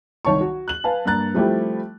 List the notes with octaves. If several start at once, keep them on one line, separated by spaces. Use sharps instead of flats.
C2 D#3 C#5 A5 C#6
F#4
F#6 F#7
B4 F5 G#5 A5
G2 A#3 A#5 F#6 A6
F3 G3 A3 C4 E4 G4